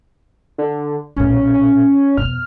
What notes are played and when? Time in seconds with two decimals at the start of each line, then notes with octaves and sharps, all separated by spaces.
0.58 D3
1.16 B1 A#2 C#4
1.54 C#4
2.17 F2 B2 F6